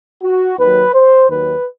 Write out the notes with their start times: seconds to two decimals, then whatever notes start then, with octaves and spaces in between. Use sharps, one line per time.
0.23 F#4
0.58 D#2 D#3 F#3 B4
0.94 C5
1.29 D#2 D#3 F#3 B4